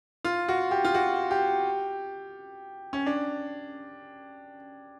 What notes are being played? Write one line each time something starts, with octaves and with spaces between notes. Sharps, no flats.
F4
F#4
G4
F4
F#4
G4
C#4
D4